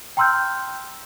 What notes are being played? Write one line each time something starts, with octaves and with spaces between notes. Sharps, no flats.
G5 A#5 C6 E6 F6 G6